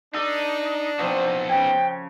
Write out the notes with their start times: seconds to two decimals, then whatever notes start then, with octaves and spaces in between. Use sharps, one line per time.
0.14 D4 D#4 A4
0.99 F3 B3 C4 D#4 F#4
1.49 C#3 G5 G#5